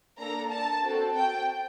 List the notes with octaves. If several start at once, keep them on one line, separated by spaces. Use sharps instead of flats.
A#3 D4 A4 A#5
A5
C4 F#4 A4
G5